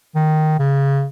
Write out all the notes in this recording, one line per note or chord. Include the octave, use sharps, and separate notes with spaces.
D#3
C#3